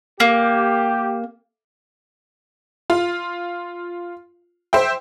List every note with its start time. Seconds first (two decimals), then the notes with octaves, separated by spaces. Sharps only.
0.20 A#3 G4
2.90 F4
4.73 C5 E5 G5